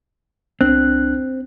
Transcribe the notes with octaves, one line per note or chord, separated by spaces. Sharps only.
C2 C4 D4 F#6